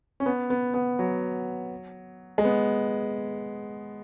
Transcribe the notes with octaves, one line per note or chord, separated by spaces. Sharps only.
C#4
B3
B3
B3
F#3
G#3
B3